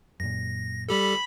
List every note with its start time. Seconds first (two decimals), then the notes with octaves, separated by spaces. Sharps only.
0.20 F#2 A#2 A#6
0.89 G3 G4 A4 B5